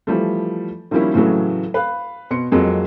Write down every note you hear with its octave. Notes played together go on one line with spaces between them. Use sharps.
E3 F3 G3 A3
D#3 F3 G3 A#3 C#4 E4
A2 C#3 E3 F#3 A3
B4 F5
B2 C6 C#7
F2 F#3 G#3 A#3